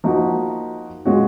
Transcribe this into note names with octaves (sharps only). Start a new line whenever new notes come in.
F3 A#3 D#4 F#4
A#2 G#3 C#4 F#4